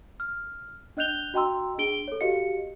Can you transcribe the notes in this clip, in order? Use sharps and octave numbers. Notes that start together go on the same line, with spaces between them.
F6
D4 D#5 F#6 G6 F7 G7
F#4 D#5 G5 A#5 C6 E6
D4 G#4 D7 G7
A4 C#5
F#4 G4 D#5 F5 C#7